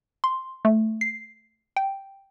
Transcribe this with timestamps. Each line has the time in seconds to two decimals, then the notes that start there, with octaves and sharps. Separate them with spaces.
0.24 C6
0.65 A3
1.01 C7
1.77 G5